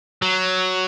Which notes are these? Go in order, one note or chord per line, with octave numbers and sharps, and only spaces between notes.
F#3